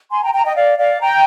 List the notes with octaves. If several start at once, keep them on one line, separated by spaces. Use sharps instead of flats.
G#5 C6
G5 A#5
G5 A#5
D#5 G5
D5 F5
D5 F5
G5 A#5